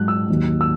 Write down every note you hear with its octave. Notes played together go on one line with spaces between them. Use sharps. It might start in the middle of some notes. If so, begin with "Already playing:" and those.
Already playing: G#2 F#3 F#6
E6
D#2 D#3 F#3
E6